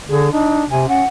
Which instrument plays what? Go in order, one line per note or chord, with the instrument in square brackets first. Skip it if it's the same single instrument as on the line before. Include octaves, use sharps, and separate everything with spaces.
[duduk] D3 [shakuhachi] G#4
[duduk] D4 [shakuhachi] D#4
[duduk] C3 [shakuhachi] G#5
[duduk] C#4 [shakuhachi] F#5